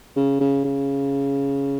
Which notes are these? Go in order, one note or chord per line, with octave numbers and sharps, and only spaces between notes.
C#3
C#3
C#3